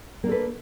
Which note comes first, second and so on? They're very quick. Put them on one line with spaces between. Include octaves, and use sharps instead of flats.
A#3 D4 A4 B4